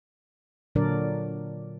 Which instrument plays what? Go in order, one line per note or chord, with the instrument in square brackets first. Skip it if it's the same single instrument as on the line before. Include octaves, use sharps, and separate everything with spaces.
[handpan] A#2 D3 F#3 D4 A#4 D5